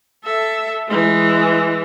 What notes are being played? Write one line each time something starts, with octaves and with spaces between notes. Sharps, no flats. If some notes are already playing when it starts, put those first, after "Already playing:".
A4 E5
E3 G#3